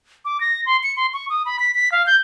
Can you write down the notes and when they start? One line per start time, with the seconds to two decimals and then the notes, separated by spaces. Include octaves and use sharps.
0.25 D6
0.40 A#6
0.66 C6
0.83 C#7
0.96 C6
1.13 C#6
1.30 D#6
1.45 B5
1.60 B6
1.75 B6
1.92 F5
2.06 G6